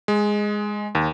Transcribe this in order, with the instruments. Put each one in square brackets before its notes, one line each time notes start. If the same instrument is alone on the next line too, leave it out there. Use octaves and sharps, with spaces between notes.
[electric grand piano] G#3
D#2